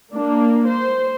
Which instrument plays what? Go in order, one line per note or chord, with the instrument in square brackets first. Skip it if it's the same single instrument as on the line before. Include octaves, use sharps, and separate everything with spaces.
[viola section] A#3 D4
C5